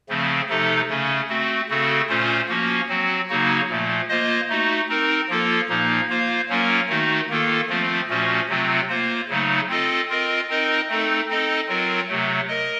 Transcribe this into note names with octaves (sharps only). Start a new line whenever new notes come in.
C#3 F3 A3 C4
C3 F3 A3 D#4 A4
C#3 A3 C#4
A3 C4 F#4
C#3 A3 C4 F#4 A4
A#2 A3 C#4 F4 C5
F3 A#3 C#4 F#4
F#3 C4 F#4
C#3 F#3 A#3 D#4 F#4
A#2 F3 A3
A#3 F4 C5 D#5
A3 D#4 F#4
C4 D#4 A#4
F3 A#3 F4 A4
A#2 F3 A#3 D#4
A#3 F4 C5 F5
F#3 A#3 C#4 F4 A#4
D#3 A3 D#4 F#4
D#3 A#3 F4 A4
F3 A3 C4 F4
A#2 F3 A3 C#4 F#4
C3 F#3 A3 C4 F4
A#3 F4 C5
C#3 F#3 A3 D#4
C4 F4 A4 D#5
C4 F4 A#4 D#5
C4 D#4 A#4 D#5
A3 C4 D#4 A4
C4 D#4 A4 D#5
F#3 C4 F4 A#4
C3 F#3 A3
A#4 D#5